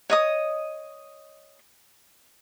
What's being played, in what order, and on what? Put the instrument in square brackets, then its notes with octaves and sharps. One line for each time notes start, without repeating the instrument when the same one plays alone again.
[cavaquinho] C#5 D#5 D#6